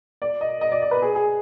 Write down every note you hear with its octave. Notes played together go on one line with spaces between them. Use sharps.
D5
D#5
D#5
D5
D5
B4
G#4
G#4